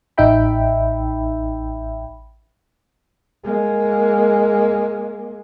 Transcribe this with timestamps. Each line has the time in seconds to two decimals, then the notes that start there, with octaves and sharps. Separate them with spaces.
0.18 A1 D#4 E5 G5 B5
3.44 G#3 A#3